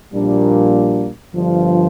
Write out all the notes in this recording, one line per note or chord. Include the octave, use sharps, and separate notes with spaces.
A#1 A#2 G3 A#3 D4
G1 G2 F3